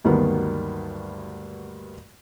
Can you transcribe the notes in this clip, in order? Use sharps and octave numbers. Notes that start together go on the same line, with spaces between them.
D2 G2 D#3 F#3 A#3 B3